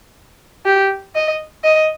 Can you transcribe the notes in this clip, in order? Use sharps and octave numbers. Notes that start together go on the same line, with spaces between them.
G4
D#5
D#5